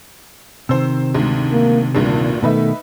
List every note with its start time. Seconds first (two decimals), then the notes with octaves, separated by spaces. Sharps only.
0.69 C3 D#3 C5 E6
1.14 D2 G#2
1.52 A#3
1.95 G#1 D2 G2 A#2
2.43 B2 D#3 A3 D#4 B4 E5